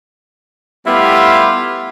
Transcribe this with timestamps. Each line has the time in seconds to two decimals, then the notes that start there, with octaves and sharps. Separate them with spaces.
0.87 G3 A3 B3 E4 F4 G4